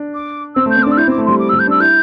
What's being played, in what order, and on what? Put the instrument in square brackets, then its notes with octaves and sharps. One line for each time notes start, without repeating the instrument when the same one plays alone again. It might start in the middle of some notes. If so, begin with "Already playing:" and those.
Already playing: [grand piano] D4
[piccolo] D6
[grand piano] C4 [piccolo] E6
[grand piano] A3
[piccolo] G6
[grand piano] C4
[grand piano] D4 [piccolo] D6
[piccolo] E6
[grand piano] E4 [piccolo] G6
[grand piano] C4
[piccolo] D6
[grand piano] A3
[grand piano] G3 [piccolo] C6
[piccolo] D6
E6
[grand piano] G3
[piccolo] G6
[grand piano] D4 [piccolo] E6
[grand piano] E4 [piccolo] G6